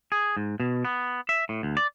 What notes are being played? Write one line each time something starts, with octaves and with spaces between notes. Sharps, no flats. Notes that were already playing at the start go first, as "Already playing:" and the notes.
G#4
G#2
B2
B3
E5
A2
D2
D5